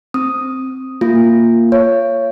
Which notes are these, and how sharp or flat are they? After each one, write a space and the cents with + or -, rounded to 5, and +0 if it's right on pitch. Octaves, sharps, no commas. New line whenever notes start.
C4 +0 D#6 +0
A#3 -10 F4 +0
C#5 +0 F5 -45